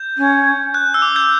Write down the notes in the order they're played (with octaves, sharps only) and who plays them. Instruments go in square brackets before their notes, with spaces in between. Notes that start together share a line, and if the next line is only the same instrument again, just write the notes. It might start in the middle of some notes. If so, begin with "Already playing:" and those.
Already playing: [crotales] G6
[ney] C#4
[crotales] F#6
E6
D6
G6